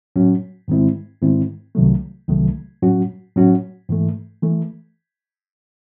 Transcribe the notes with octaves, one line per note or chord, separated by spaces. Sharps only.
A2 F#3 C#4 F#4
G#2 D#3 G#3 C4 E4
G#2 D#3 G#3 C4 E4
C2 C3 D#3 F#3 A3
C2 C3 D#3 F#3 A3
A2 F#3 C#4 F#4
A2 F#3 C#4 F#4
G#2 E3 A3
E3 A3